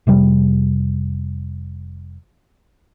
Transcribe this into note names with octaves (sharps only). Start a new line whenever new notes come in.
F1 C3 G3